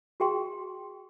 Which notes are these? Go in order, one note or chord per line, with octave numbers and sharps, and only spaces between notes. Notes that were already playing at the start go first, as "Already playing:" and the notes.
F#4 G#4 G5 C6